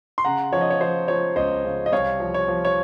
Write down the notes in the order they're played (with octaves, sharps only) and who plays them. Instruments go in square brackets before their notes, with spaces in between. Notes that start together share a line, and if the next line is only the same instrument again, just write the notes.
[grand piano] C6
C#3 F#5 A#5
F3 C#5
D#5
C#5
F3 C5
F3 C#5
C#2 C5 D#5
C#3
D#5
C2 C#5 F5
F3
C#5
F3
C#5